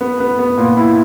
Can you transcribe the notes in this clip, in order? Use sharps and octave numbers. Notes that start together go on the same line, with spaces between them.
B3
B3
B3
A#2
E4